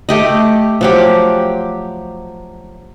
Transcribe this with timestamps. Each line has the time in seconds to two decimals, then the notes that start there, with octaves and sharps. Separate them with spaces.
0.09 A3 G4 D#5
0.81 F3 F#3 G4